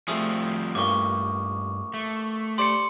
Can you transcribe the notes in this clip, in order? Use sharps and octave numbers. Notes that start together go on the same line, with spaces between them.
F3 G3 A3 C4 G#4 D#6
A1 G2 A#2 C#6 D6
A3
G4 C5 D5 C6 C#7